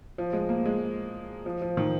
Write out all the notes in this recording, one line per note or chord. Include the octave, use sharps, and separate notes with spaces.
F3
G#3
A#3
G#3
F3
F3
D#3